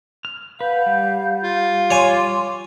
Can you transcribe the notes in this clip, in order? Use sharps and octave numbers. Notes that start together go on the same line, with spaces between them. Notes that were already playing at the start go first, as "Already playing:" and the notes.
F6
B4 F5 F#5 G6
G3
F4
C#5 G#5 C6 D6